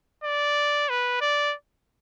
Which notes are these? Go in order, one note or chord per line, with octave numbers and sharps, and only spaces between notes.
D5
B4
D5